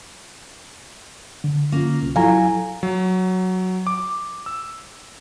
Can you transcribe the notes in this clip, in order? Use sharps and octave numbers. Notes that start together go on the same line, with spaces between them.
D3
A#3 C#4 F4
C2
F#3 E4 A4 F5 G#5 A#5
F#3
D6
E6